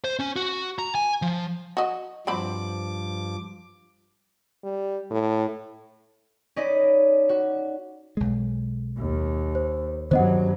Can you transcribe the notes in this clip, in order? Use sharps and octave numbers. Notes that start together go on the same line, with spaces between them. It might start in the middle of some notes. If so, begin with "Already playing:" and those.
C5
C#4
F#4
A#5
G#5
F3
F#4 D#5
G2 F3 F#3 C4 B5 D6
G3
A2
C#4 D#4 D5 D#5 B5
F#4
B1 G#3
D#2
C5
G2 D#3 F#3 B3 C#4 C5 D#5 F#5